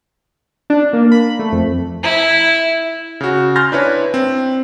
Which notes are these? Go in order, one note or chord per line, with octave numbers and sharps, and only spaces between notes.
D4
A#3
B5
A3
F2
E4
C#3 F#4
G#5 C6 F6 G6 A6 A#6
D4 E4 B4 C#5
C4